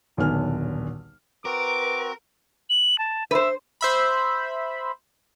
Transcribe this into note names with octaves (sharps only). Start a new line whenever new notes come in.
D#1 B1 D3 B3 G#5 F6
C4 F#4 A#4 B4 D6
F#7
A5
B4 C5 E5
C5 E5 B5